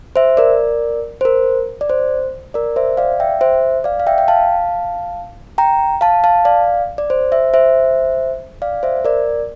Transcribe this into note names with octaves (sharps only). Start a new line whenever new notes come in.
C5 E5
A#4 D5
C5
A#4
D5
C5
A#4 D5
C5 E5
D5 F5
E5 G5
C5 E5
D5 F5
F5
E5 G5
G5
F5 A5
G5 A#5
F5 A5
F5 A5
D5 F5
D5
C5
C5 E5
C5 E5
D5 F5
C5 E5
A#4 D5